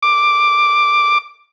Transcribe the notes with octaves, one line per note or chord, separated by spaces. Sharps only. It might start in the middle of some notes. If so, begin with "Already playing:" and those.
D6